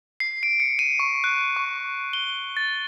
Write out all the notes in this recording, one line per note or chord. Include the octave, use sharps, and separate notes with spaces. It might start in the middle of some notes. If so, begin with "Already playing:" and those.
C7
D7
C#7
D#7
C#6
F#6
C#6
G7
A6